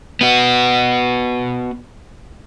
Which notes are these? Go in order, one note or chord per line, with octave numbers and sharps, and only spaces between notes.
B3 F#4